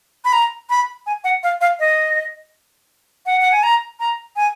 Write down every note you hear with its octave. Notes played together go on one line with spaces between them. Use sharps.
B5
A#5
B5
G#5
F#5
F5
F5
D#5
F#5
F#5
G#5
A#5
A#5
G#5